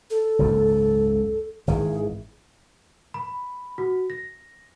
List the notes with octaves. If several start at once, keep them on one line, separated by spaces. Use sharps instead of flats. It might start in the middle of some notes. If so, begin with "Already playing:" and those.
A4
F#1 C#2 G#2
G#1 D#3 E3 G#4
B5
F#4
A#6